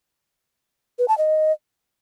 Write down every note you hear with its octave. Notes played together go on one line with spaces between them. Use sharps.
B4
A5
D#5